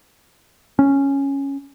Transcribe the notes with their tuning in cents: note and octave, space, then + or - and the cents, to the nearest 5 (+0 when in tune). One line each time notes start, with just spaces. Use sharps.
C#4 -5